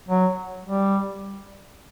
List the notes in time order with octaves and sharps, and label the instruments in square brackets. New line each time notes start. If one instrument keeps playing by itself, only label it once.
[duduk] F#3
G3